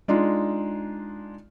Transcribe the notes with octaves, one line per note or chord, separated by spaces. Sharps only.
G#3 D4 D#4 F4